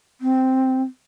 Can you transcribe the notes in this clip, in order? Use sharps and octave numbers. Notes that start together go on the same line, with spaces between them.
C4